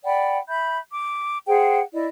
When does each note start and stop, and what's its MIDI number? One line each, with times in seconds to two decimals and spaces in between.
0.04 0.38 74
0.04 0.38 78
0.04 0.38 79
0.04 0.38 83
0.48 0.78 76
0.48 0.78 83
0.48 0.78 91
0.92 1.39 86
1.47 1.80 68
1.47 1.80 72
1.47 1.80 78
1.47 1.80 79
1.93 2.07 64
1.93 2.07 74
1.93 2.07 75